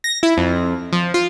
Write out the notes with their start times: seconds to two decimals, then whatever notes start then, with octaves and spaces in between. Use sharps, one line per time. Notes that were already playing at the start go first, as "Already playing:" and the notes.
0.04 A#6
0.23 E4
0.37 F2
0.93 F3
1.14 F4